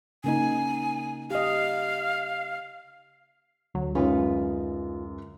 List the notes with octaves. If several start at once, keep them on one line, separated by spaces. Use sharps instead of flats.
C#3 A#3 D#4 G#5
G4 D#5 F5
D2 F#3
F#2 G#3 C#4 D#4 F4 B4